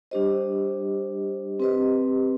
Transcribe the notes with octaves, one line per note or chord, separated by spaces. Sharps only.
G3 D4 G4 C5 D#5
C4 G4 B4 D#5